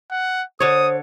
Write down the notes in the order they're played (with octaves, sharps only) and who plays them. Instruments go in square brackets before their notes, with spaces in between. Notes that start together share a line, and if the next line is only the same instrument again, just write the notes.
[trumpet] F#5
[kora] D3 C#5 [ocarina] C5 [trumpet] D#6